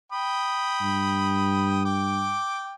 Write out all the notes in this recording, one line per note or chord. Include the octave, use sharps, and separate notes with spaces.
G5 B5 D#6
G2
G5 D6